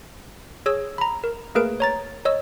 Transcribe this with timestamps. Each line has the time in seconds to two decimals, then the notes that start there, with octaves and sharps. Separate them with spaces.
0.66 G#4 C#5 E6
0.98 A#5 B5
1.24 A#4
1.55 A3 A#3 G#4 A#4 B4 D7
1.80 C#5 A#5 A6
2.25 C#5 D#5 E6